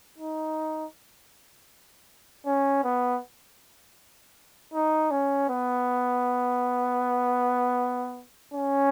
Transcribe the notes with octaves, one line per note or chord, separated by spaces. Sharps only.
D#4
C#4
B3
D#4
C#4
B3
C#4